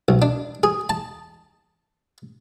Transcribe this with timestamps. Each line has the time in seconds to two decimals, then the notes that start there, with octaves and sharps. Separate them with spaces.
0.08 B1
0.22 D4
0.63 G#4
0.89 A5